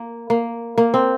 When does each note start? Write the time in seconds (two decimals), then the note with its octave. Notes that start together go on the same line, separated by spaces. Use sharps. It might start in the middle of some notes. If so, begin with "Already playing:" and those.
Already playing: A#3
0.30 A#3
0.78 A#3
0.94 C4